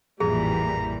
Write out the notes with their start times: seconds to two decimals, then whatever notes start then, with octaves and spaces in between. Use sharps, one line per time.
0.20 A1 F2 A#2 E3 G3 G#4 A#5